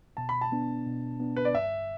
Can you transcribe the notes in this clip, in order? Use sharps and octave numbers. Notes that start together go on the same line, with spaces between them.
B2 A5
B5
A5
B3 D4
B2
B3 D4
B4
D5
G2 E5